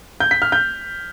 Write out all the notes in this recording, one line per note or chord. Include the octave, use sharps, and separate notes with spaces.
G6
B6
F6
G6